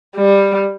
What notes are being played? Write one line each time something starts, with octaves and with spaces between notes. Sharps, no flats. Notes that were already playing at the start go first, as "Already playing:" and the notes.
G3